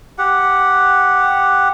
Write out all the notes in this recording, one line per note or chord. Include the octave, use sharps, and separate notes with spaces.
G4 F#5